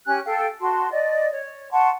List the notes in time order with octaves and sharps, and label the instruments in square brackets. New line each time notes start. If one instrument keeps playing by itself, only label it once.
[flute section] C#4 G4 G#5 F#6
A4 F5 G5
F#4 A5 C6
D5 D#5
C#5
F#5 A5 C6 C#6